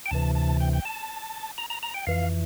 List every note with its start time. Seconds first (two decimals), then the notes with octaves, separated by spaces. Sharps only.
0.06 G5
0.11 D2 C3 E3 A5
0.35 A5
0.60 G5
0.73 G5
0.85 A5
1.58 A#5
1.70 A#5
1.83 A#5
1.94 G5
2.07 F2 E3 F5